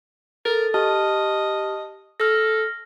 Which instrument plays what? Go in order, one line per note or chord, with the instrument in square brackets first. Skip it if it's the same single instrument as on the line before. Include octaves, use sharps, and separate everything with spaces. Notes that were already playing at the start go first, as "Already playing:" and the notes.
[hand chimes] A4 A6 [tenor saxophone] A#4
[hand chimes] G4 A5 F6 [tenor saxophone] D#5
[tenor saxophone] A4 [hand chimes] F6 A#6